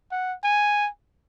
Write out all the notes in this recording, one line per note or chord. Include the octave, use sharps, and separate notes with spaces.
F#5
G#5